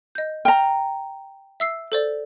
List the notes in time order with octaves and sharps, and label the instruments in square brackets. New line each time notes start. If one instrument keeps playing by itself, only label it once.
[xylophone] D#5 G6
[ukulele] G5 A#5 [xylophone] F6
[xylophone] E5 E6 C7
A4 C5 D5